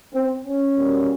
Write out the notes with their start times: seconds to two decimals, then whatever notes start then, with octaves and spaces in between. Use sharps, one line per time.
0.14 C4
0.45 C#4
0.76 B2 G3 A#3